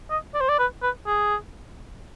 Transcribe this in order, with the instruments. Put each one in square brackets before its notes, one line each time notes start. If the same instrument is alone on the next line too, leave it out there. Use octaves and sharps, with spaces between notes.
[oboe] D#5
D5
C5
D5
B4
B4
G#4